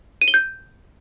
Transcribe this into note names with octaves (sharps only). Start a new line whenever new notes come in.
D#7
G7
G6